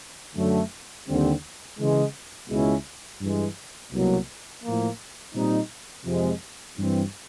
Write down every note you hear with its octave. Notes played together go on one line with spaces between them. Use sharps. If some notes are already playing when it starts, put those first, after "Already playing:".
F#2 D3 F#3 A3
D#2 D3 G3 C4
C#3 E3 G#3
C#2 B2 G#3 C#4 E4
G2 E3 G#3
C2 B2 F#3 A#3
A2 F3 A#3
A#2 G3 C4 D#4
F2 C3 F3 G#3
G2 E3 G3 C4